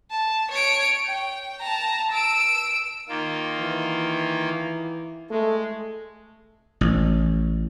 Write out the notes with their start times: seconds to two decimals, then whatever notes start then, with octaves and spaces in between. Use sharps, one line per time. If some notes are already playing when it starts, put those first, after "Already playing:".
0.11 A5
0.51 C#5 D7
1.05 G5
1.60 A5 A#5
2.11 E6 D7
3.09 D#3 A#3 F4
3.59 E3
5.30 G#3 A3
6.81 A1